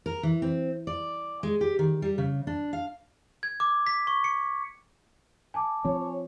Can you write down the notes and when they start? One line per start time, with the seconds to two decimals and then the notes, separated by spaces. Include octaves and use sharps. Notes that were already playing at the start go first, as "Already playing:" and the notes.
0.06 A#4
0.23 E3
0.42 C4
0.87 D5
1.43 G#3
1.61 G4
1.79 D#3
2.02 G3
2.18 C#3
2.47 D4
2.73 F5
3.43 G#6
3.60 D6
3.87 B6
4.07 C#6
4.24 C#7
5.54 G#5 A5 D6
5.85 F3 C4 C#5